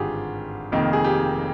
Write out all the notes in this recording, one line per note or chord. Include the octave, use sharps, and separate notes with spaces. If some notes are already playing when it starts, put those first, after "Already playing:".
Already playing: G#1 G2 D3 F4 G4 G#4
F1 F2 D#3 A#3
G#4
G4